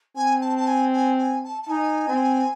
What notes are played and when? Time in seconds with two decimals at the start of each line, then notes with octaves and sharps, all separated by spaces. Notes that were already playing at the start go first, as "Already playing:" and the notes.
0.16 C4 G#5
0.42 A5
0.57 A5
0.67 G#5
0.93 G#5
1.19 G#5
1.44 A5
1.62 A5
1.69 D#4 G#5
2.08 C4